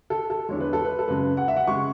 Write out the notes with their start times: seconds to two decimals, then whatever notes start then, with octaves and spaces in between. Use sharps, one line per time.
0.10 A4
0.30 A4
0.49 E2 D3 G#3 C#5
0.60 B4
0.73 A4
0.85 B4
0.99 A4
1.08 F#2 C#3 G#3 B4
1.37 F#5
1.48 E5
1.57 F#5
1.67 C#3 G#3 C#6